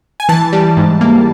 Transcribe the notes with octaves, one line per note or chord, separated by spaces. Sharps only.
G#5
E3 A5
G3
G#2
A#3